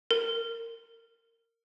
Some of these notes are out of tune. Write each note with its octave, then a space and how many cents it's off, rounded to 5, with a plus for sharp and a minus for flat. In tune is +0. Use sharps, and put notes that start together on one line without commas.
A#4 -20